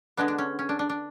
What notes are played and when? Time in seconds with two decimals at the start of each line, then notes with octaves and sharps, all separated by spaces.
0.17 D3 G#3 B3 D4
0.28 D4
0.38 C#4
0.59 C#4
0.69 D4
0.79 D4
0.89 D4